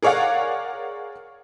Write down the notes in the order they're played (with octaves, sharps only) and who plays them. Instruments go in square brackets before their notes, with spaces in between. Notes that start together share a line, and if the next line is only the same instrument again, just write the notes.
[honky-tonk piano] G#4 A#4 C#5 D5 F5 F#5